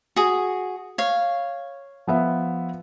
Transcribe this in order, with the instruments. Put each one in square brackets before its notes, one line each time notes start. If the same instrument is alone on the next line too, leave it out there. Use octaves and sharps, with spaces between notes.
[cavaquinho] F#4 G#4
C#5 F5
[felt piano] F3 B3 E5